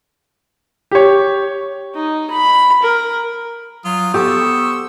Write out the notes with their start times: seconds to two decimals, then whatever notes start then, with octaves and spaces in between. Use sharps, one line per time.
0.91 G4 C#5
1.95 D#4
2.31 B5
2.83 A#4
3.85 F#3 F4 D#6
4.14 B3 G4 A4 C5 C#6 E6